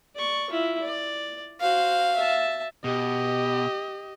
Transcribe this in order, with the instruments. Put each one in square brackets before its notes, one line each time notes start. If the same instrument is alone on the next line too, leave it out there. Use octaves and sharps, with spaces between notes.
[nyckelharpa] D5 C#6
E4 F4
D5
[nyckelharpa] F#4 C5 [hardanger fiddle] F5
[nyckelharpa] E5 A5
[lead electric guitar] B2 [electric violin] G4 D#5